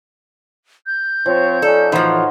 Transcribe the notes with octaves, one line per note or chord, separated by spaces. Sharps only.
G6
F3 C4 C#5
C#4 D#4 A4 D5
A2 E3 F3 D#4 F#4 C5